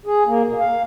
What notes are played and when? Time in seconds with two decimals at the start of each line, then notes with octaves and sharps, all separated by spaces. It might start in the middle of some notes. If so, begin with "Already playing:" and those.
0.06 G#4
0.26 A#3
0.46 B2
0.59 F5